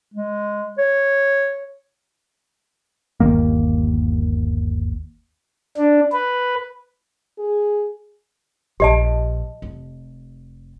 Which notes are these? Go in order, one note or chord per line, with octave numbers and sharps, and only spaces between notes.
G#3
C#5
G1 D#2 D#3 A#3
D4
B4
G#4
A#1 G4 D#5 A5
F1